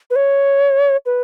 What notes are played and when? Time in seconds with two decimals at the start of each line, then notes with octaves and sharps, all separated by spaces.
0.11 B4
0.16 C#5
1.06 B4